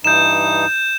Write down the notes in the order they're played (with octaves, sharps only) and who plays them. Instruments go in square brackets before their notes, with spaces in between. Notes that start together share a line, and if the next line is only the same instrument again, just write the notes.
[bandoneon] G2 E3 D#4 [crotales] G6 E7